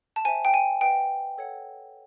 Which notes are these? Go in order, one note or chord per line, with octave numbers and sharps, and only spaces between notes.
A5
C5 E5 G5 G#5
G5
G#5
B4 D#5 F#5 G5
A4 C#5 F#5